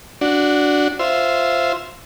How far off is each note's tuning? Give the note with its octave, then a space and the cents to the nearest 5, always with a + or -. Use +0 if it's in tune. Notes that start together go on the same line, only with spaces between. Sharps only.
D4 -5 F#4 +0
F4 +0 C5 +0 E5 +5